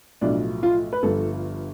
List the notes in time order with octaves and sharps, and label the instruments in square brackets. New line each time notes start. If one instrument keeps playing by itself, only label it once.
[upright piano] B1 A2 F3 D4
F4
B4
G1 G2 F3 A4